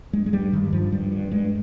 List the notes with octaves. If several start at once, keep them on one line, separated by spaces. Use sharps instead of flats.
G2 G#3
G#3
G2 G3
G2 D#3
G2 F3
G2 G3
G2
G2 G#3